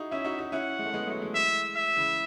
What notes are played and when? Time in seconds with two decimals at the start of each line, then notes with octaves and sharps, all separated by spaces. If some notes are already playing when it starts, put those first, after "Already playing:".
Already playing: D#4 E4 F#4 G#4
0.11 C#4 E4 E5
0.25 D#4 F#4
0.39 D#4 F#4
0.52 C#4 E4 F#5
0.79 G#3
0.85 A3
0.93 G#3 B3
1.07 F#3 A3
1.21 E3 G#3
1.35 E5
1.76 E5
1.97 C#3 E3